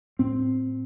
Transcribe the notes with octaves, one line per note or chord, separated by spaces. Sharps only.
A2 C4